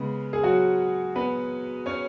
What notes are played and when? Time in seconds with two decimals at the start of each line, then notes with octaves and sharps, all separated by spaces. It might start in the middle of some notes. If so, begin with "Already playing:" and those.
Already playing: C#3 G#3 B3
0.33 G#4
0.44 F#3 F#4
1.16 B3 B4
1.86 C#4 C#5